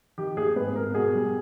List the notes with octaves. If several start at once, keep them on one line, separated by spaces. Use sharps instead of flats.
D#3 G4
A#3 G#4
G#2 B4
G#2 A#4
B2 G#4
G3